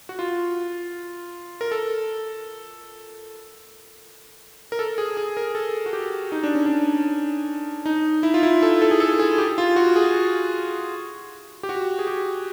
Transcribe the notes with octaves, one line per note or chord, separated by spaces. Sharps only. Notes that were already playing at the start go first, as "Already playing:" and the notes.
F#4
F4
A#4
A4
A#4
A4
G#4
G#4
A#4
A4
F#4
G4
D#4
D4
C#4
D4
D#4
E4
F4
E4
A4
A4
G#4
A4
G#4
G4
F4
F#4
G#4
G4
F#4
G#4
G4